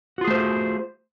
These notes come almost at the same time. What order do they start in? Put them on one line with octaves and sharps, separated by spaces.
F#4 F4 G#4 A3 C5